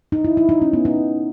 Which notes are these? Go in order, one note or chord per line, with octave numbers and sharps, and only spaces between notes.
D#4
E4
E4
D#4
C#4
B3
D#4